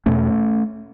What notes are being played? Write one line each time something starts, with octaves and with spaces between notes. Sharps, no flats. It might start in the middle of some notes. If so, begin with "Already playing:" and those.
E2 B2 A3 C#4